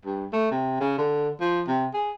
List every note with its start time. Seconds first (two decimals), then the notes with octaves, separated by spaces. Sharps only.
0.05 G2
0.33 A3
0.51 C3
0.80 C#3
0.98 D3
1.41 F3
1.68 C3
1.94 G#4